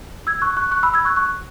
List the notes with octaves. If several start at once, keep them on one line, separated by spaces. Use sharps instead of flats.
E6 G#6
C#6 F#6
C#6 F#6
C#6 F#6
B5 E6
E6 G#6
C#6 F#6
C#6 F#6